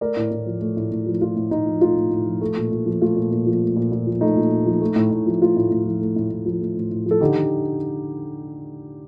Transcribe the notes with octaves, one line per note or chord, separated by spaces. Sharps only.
A3 A#4 D5
A2
A2
F3
A3
A2
A2
F3
A3 F4
A2
A2 D#4
F3
A3 F4
A2
A2
F3
A3
A#2
A#2
F3
A3 F4
A#2
A#2
F3
A3
A#2
A#2
F3
A3 D#4
A#2
A#2
F3
A3
A2
A2
F3
A3 F4
A2
A2
F3
A3
A2
A2
F3
A3
A2
A2
F3 A4
D3 D#4 G4
D3